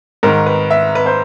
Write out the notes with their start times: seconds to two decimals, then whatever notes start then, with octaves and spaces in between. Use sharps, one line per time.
0.23 G#2 D#3 A#4
0.46 B4
0.70 E5
0.95 B4
1.06 C5